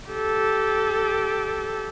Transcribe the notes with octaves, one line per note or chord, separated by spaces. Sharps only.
G4 A4